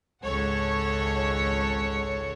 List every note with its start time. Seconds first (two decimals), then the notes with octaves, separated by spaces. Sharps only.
0.23 G#1 C#2 A4 C#5 F#5